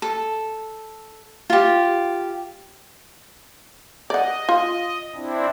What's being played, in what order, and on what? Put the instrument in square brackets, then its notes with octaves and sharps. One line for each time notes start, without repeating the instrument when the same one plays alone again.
[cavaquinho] A4
F4 G4
[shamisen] D5 F#5 [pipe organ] D#5
[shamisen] F4
[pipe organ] C4 D4 E4